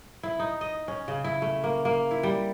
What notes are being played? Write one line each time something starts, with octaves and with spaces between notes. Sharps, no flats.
E4
D#4
D#5
C#4
C#3
E4
A3
A#3
A#3
E4
G3